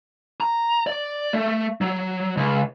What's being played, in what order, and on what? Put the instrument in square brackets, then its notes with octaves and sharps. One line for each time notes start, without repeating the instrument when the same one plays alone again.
[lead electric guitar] A#5
D5
A3
F#3
C#2